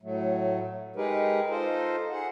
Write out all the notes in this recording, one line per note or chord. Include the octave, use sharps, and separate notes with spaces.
A2 F#3 A3
G#3 D#4 G4 G#4 A#4 B4
D#4 F4 A4 C5 D#5
G#4 F#5